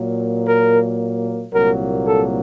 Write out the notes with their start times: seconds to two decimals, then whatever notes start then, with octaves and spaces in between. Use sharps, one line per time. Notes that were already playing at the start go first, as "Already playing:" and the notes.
Already playing: A#2 F#3 A#3
0.47 A#4
1.52 C2 A#2 F#3 A#3 A#4
2.06 A4